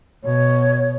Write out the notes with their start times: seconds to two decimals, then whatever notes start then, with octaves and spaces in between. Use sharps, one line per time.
0.24 B2 C#5